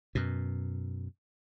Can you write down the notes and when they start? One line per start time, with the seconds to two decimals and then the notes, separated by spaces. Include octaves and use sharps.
0.15 F#2 B2